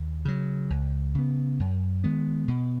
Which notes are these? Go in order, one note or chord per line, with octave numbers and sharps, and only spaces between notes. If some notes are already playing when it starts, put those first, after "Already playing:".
Already playing: D#2
C#3 F#3
C#2
C#3 B3
F#2
D#3 G#3 B3
B2